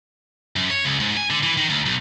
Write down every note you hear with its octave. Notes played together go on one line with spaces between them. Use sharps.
F#2
C#5
C#2
G#2
G#5
D3
E3
D#3
D2
B1